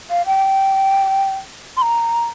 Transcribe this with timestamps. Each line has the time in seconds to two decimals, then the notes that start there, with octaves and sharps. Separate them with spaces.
0.10 F5
0.26 G5
1.77 C6
1.81 A#5